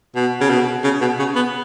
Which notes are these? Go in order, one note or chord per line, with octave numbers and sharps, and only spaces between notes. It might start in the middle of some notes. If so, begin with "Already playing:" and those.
B2
C#3
B2
C#3
B2
C#3
B3